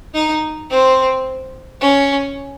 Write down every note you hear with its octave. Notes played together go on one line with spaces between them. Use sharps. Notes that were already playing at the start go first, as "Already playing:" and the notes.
D#4
C4
C#4